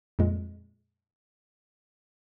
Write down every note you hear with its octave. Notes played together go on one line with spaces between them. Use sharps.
F2 A#2 G#3